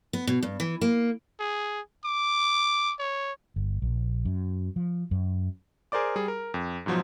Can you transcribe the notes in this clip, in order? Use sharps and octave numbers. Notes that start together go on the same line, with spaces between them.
B3
B2
G2
E3
A#3
G#4
D6
C#5
G1
A#1
F#2
F3
F#2
G#4 A#4 C5 D5 D6
G3 G#4
A#4
F2
G#2 B2 F3 F#3 C5